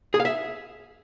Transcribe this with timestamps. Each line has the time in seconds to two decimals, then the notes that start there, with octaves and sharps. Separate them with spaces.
0.14 G#4
0.20 F5
0.25 E5